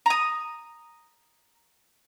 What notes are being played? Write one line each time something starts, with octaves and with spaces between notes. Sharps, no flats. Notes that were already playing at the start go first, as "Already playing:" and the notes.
A#5 D#6